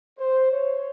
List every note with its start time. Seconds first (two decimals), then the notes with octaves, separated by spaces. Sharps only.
0.19 C5
0.51 C#5